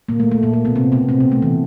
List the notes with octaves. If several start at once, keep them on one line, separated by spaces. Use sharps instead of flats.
A#2 A#3
A3
A3
A#2 A#3
A3
B2 B3
C3 C4
B2 B3
C3 C4
B2 B3
A3
E3